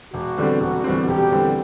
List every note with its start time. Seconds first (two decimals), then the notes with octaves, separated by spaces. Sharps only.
0.13 E1 F#4
0.37 E2 D3 G3 C4
0.60 E1 F#4
0.84 E2 D3 G3 C4
1.07 E1 G4
1.31 E2 D3 G3 C4